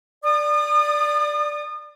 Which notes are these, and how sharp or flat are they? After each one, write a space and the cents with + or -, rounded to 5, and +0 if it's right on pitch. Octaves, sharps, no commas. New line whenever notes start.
D5 +0 D#6 -35